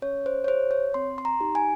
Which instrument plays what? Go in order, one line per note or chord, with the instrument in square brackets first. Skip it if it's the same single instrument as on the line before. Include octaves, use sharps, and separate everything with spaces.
[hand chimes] C#4 C#5
C5
C#5
G4 C5
C#5
C4 C6
C6
A#5
D#4 G4
G#5